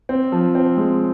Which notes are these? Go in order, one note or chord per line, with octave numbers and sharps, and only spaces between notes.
C4
F3
C4
G#3